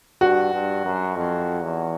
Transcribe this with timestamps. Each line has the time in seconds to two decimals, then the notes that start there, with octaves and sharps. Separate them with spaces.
0.21 G2 F#4
0.53 G2
0.85 F#2
1.16 F2
1.62 E2